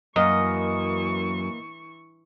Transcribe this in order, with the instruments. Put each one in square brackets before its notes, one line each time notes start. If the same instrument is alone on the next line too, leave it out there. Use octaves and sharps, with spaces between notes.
[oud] F#2 [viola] E3 C#6 [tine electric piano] A#3 A#4 [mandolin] D#5